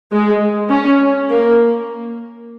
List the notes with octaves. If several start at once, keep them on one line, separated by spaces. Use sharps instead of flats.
G#3
C#4
A#3